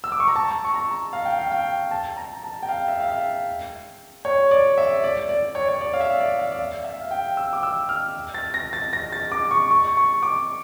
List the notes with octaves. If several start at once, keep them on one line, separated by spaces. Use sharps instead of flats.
E6
D6
C#6
A#5
A5
C#6
A#5
F5
G5
F5
G5
A5
A#5
A5
G5
F5
E5
F5
E5
C#5
D5
E5
D5
D5
C#5
C#5
D5
F5
E5
D5
F5
D5
E5
E5
F5
G5
E6
D6
E6
F6
A6
A#6
A6
A#6
A6
D6
C#6
C#6
C#6
D6